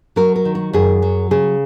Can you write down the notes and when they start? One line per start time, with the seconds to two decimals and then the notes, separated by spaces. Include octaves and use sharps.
0.16 F#3 A#4
0.36 A#4
0.45 D#3
0.55 F#4
0.73 F#2 G#4
1.02 F#3
1.31 C#3 G#4